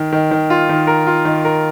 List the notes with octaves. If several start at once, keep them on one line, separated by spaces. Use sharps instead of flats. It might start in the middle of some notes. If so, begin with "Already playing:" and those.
Already playing: D#3
D#3
D#3
F4
D#3
A#4
F4
D#3
A#4